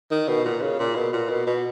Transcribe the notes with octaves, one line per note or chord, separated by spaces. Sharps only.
D#3
B2
A#2
C#3
A#2
B2
A#2
B2
B2